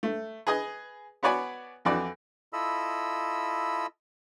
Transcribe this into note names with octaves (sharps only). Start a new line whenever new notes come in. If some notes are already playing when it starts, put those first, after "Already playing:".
A3
G#4 B4 D#5 G#5 D#6
B3 F#4 C#5 D5 G#5 B5
F2 E3 F#4 D5
E4 F4 A4 D#5 B5 E6